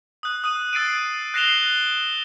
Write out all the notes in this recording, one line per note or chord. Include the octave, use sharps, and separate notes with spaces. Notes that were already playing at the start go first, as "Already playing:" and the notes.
D#6 F#6
D#6 F#6 D#7
E6 A6 C7 D7 D#7
F#6 A#6 C7 E7 F7 G7